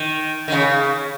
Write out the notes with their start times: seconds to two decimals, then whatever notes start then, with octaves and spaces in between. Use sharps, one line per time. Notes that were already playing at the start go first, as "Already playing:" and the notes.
Already playing: D#3
0.48 D#3
0.52 C#3